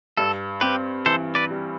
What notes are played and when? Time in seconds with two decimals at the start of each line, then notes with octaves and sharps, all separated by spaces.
0.17 G2 A4
0.61 C4 G4 B4
1.06 E3 A4 C5
1.35 B4 D5
1.51 G3